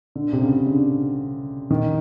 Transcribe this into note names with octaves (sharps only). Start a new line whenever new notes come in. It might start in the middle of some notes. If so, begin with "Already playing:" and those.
D3
C3
C#3
D3
D#3